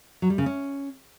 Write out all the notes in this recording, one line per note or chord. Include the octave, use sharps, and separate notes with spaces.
F#3
G3
C#3
C#4